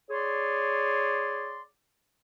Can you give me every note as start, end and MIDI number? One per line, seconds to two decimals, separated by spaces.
0.10 1.61 68
0.10 1.61 73
0.10 1.61 74
0.10 1.61 84